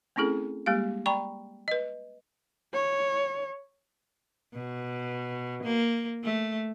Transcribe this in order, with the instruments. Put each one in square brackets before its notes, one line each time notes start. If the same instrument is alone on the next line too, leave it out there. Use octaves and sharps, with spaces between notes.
[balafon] A3 C4 C#4 E4 G#4 A4
G3 G#3 A#3 G4 F5
D5 G5 A#5 B5 C#6
B4 D#5
[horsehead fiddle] C#5
[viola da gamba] B2
A#3
A3